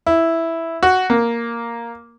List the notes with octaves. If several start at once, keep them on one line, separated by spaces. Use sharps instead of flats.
E4
F#4
A#3